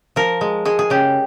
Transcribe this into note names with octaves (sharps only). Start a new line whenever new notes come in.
F3 A#4
G#3
G#3 G#4
G#4
C#3 G4